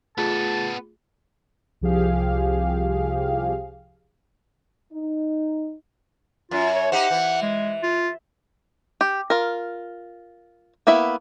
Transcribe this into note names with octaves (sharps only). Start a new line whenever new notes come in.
A3 B3 F4 G#4 A4 A5
C2 F3 G4 G#4 F5
D#4
F#2 F4
C#5
D#4 G4 C5 F#5
E3
G#3
F4
G4
F4 A#4
A#3 B3 E4 E5